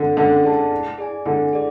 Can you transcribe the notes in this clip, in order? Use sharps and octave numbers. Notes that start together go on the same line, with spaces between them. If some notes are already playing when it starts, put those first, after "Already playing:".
Already playing: D3
D3 C#4
E4 G#4 D5 A5
E4
G#4 D5 G#5
D3 E4
G#4 D5